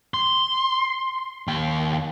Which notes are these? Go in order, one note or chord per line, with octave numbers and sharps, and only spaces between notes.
C6
D#2 G5